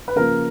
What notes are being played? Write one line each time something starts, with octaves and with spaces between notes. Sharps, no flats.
B4
C#3 F3 A#3 A#4